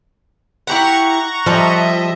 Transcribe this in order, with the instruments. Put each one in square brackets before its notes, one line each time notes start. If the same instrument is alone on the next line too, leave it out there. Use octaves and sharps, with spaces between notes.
[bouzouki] E4 G4 B4 [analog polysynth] F#5 A#5 C#6
[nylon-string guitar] F3 [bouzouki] G3 A5 [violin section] A4 D#5 E5